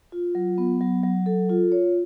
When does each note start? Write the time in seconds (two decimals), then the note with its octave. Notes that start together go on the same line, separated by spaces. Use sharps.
0.12 F4
0.35 F#3
0.58 B3
0.81 F#3
1.03 F#3
1.26 A4
1.50 F4
1.72 C#5